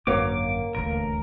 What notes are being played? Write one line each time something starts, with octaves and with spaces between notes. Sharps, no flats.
G#1 F#2 D3 A#3 F#4 C#5 F5 D6
D#1 A1 D2 A#4